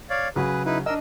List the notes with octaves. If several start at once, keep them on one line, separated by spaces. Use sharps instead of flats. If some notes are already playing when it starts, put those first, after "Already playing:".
C#5 D5 F5
C#3 F#3 F#4 G#4 B4
D#4 E4 B4
D4 A#4 D#5 E6